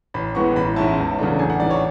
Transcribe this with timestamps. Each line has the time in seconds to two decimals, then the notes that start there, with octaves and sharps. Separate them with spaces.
0.14 A1 B5
0.35 A2 E3 G#3 B3 C#6
0.56 A1 B5
0.76 G#2 G#3 C#4 E4 A5
0.98 E2
1.19 C#3 F#3 A3 D4
1.39 A1 G#5
1.50 F#5
1.60 G#2 E3 D5
1.70 C#5